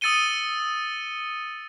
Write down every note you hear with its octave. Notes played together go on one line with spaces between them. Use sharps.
D#6 E6 A6 C#7 D#7 G7